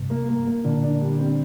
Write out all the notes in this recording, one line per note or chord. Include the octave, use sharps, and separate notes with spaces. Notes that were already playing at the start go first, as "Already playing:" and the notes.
Already playing: G2 C3
A#3
A#3
A#3
A#2 D3 D4
D4
G3
C4